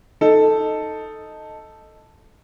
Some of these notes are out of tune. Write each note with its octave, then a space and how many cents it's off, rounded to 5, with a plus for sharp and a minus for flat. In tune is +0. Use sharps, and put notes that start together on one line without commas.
D#4 +0 A4 +0